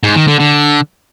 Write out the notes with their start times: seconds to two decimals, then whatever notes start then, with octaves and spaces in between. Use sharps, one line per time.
0.04 G#2
0.15 D#3
0.27 D3
0.39 D3